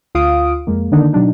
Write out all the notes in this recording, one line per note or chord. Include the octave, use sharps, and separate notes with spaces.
D2 F4 F5 D#6 D7
F2 G#3 A#3
D3 D#3 A#3 D4 D#4
B2 F#3 D4 D#4